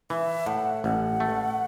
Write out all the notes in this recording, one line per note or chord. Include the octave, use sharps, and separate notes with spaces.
E3 E5
A2 F#5
A1 F#5
A3